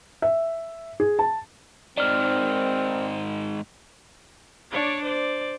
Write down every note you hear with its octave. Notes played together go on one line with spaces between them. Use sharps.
E5
G#4
A5
G#2 D#3 C4 D5 F6
D4 C#5 D5
C5 D5